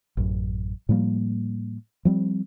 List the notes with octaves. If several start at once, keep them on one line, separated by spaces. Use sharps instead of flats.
A1 F#2
A2 F3 G3 A#3
F3 G3 C4